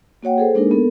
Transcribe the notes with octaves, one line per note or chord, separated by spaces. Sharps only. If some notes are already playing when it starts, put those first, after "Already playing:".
A#3 F#4 C#5 F#5 G5
G#4 A4 C5
G#3 A#3 D4 D#4 G#4 A#4
B3 A4 A#4